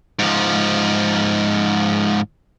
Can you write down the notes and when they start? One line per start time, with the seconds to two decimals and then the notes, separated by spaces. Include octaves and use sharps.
0.19 G#2 F3